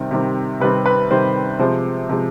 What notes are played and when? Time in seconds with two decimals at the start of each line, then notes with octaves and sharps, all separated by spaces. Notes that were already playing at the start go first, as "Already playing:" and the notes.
Already playing: C3 D#3 G3 C4
0.11 C3 D#3 G3 C4
0.60 C3 D#3 G3 C4 B4
0.86 B4
1.10 C3 D#3 G3 C4 C5
1.59 C3 F3 G#3 C5
2.09 C3 F3 G#3